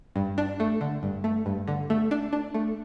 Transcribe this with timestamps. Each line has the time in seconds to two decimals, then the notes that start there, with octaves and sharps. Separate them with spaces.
0.16 G2
0.38 D4
0.60 A3
0.81 D3
1.03 G2
1.24 A3
1.46 G2
1.68 D3
1.90 A3
2.11 D4
2.33 D4
2.54 A3